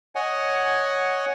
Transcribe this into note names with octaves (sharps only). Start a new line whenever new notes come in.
C#5 D#5 F#5 G#5